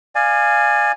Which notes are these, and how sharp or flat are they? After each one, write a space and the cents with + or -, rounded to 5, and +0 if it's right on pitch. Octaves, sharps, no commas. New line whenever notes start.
D5 +30 F5 +0 G#5 +0